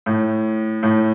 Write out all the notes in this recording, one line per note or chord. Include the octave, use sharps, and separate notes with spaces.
A2
A2